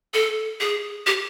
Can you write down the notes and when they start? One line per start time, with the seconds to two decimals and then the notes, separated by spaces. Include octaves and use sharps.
0.14 A4
0.60 G#4
1.07 G4